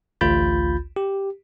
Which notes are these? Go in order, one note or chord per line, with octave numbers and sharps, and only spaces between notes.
A1 D2 F4 B5 G6 A6
G4